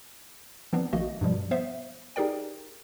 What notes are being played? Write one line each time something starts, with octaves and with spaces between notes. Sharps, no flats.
E3 F3 B3 C4 D4
A#1 D#3 A3 A#3 F#4 D#5
G2 B2 F3 G3
B3 C5 E5 F5
D#4 G4 G#4 A#4 D5 G5